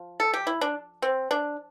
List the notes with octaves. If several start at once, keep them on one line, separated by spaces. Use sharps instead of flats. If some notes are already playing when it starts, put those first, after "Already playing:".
Already playing: F3
A4
G4
E4
D4
C4
D4